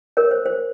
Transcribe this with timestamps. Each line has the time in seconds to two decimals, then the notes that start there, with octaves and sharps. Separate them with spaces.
0.17 A#4 C#5
0.31 C5
0.46 C5